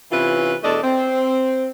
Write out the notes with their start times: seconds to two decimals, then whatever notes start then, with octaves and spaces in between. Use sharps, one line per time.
0.12 C3 E3 C#4 E4 F4 B4
0.63 E2 B2 A3 D4 A4 D#5
0.83 C4